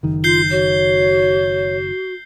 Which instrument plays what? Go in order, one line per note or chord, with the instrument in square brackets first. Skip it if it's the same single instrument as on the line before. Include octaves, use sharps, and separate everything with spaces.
[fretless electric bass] F#1 D#3
[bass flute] F4 [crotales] G6 C7 G7
[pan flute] F#4 [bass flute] C#5